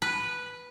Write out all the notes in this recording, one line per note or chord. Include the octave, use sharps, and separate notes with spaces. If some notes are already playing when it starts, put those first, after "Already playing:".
B4